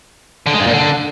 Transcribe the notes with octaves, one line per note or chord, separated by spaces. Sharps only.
D3
G#3
G2
A#2
D3